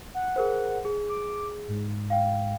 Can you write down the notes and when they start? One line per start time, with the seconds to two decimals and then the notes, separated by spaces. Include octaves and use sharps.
0.14 F#5
0.36 G#4 A#4 C5
0.85 G#4
1.09 D6
1.68 G#2
2.10 F5 G5